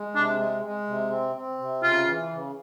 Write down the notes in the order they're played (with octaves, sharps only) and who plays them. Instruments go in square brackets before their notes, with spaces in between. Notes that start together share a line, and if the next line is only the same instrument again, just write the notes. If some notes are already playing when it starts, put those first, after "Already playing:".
Already playing: [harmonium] G#3
[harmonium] C3 [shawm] D4
[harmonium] G#3
G#3
C3
C4
C4
C3
[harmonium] C#3 [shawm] F4
[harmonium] E3
C#3